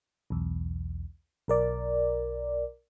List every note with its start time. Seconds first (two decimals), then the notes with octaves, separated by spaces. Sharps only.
0.30 B1 E2
1.48 B1 A#4 D5